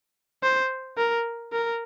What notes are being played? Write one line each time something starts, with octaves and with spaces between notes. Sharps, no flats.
C5
A#4
A#4